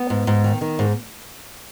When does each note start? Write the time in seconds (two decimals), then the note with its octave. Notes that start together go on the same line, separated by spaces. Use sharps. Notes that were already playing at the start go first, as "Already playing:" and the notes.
Already playing: B3
0.10 G#2
0.27 G#2
0.44 D#3
0.61 D#3
0.79 G#2